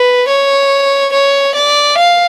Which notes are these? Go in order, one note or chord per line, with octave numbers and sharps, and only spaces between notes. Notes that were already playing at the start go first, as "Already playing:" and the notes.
Already playing: B4
C#5
C#5
D5
F5